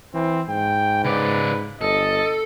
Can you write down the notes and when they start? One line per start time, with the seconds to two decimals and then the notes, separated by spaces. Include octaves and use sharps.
0.14 E3 C4
0.49 G#2 G5
1.05 C#3 B4 D5
1.81 G1 A4 D#5